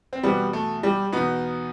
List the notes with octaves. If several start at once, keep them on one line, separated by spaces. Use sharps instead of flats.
C4
E2 B2 G3 B3
A3
G3
E2 B2 B3 D#4